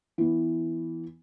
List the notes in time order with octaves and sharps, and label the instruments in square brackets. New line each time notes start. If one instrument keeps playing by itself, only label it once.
[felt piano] E3 B3